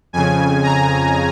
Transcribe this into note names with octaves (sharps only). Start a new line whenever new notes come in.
F2 C#3 G#5
A#5